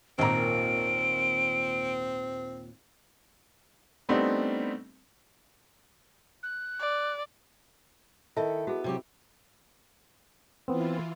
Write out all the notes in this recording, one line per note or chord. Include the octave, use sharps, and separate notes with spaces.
G#1 D#2 A#2 C4 A#5 D7
G3 A3 B3 C4 D4 D#4
F#6
D5
D#3 E4 A4 D#5 E5 A5
B3 F#4 G#4
C3 F#3 G4
E3 B3 C4 E4 F4